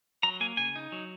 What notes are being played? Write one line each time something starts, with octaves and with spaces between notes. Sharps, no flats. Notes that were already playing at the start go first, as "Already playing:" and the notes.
F#3 A#5
A#3 G#5
C#3 G#5
D#4
F#3